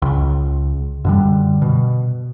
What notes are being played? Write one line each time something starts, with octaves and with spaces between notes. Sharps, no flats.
C#2
F#2 D3 G3
B2